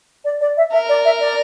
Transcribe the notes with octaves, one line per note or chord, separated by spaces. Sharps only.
D5
D5
E5
A#4 E5
D5
E5
D5